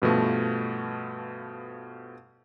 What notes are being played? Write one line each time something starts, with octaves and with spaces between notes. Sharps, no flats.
G2 B2 F3 A3